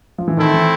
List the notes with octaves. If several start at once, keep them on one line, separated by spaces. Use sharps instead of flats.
F3
E3
D#3 A3 C4 E4 A4
E3